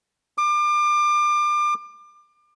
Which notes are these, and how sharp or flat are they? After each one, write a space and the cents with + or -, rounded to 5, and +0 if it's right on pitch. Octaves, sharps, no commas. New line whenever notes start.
D6 +30